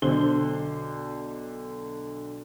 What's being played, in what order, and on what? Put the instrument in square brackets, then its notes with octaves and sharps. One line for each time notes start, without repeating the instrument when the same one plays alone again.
[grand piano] B1 D3 C5 G7